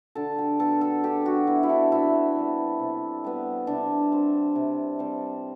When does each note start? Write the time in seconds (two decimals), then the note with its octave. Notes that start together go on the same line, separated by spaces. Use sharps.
0.15 D3 A4
0.38 G4
0.59 F#3 B3 A4
0.81 A4
1.03 D3 G4
1.26 F#4
1.47 F#3 B3 E4
1.63 E4
1.69 D4
1.92 C3 E4
2.36 G3 B3
2.79 C3
3.24 G3 B3
3.67 C3 D4
4.12 G3 C4
4.56 C3
4.99 G3 C4